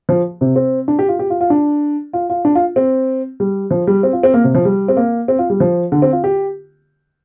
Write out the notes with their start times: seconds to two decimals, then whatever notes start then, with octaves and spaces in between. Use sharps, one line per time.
0.09 F3
0.41 C3
0.56 C4
0.88 D4
0.99 G4
1.09 F4
1.19 G4
1.30 F4
1.41 F4
1.50 D4
2.13 F4
2.30 F4
2.45 D4
2.55 F4
2.76 C4
3.40 G3
3.71 F3
3.87 G3
4.03 C4
4.13 F4
4.23 C4
4.34 A#3
4.44 C3
4.55 F3
4.65 G3
4.88 C4
4.97 A#3
5.28 C4
5.39 F4
5.50 G3
5.60 F3
5.92 D3
6.02 C4
6.13 F4
6.24 G4